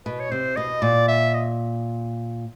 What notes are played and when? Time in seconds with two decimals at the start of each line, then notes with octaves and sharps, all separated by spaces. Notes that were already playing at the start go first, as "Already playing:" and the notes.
0.05 B2 B4
0.20 C#5
0.31 C3 C5
0.56 B2 D#5
0.82 A#2 D5
1.08 E5
1.34 D#5